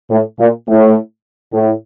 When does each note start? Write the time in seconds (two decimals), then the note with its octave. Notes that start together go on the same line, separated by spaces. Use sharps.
0.11 A2
0.40 A#2
0.68 A2
1.53 A2